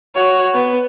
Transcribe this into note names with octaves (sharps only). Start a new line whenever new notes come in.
F#4 C#5
B3